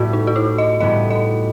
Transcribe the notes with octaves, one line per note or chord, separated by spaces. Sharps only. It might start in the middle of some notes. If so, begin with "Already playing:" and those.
Already playing: A2 G3 B3 F#4
D#4
F#4
E4
D#5
A2 G3 B3 D#5
D#5